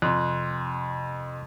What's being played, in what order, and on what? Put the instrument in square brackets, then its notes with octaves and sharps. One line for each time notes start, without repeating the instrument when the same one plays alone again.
[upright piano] F2 [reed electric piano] C3 C6 F#6